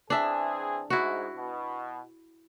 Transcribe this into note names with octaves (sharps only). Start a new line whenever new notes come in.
E3 C4 D4 G#4 E5
G#2 E4 F#4
B2